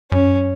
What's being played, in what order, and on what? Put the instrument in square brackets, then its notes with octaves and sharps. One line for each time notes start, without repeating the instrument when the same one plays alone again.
[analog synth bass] F#2 [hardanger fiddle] C#4